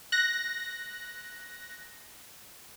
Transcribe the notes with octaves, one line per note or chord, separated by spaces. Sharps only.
F#6 A#6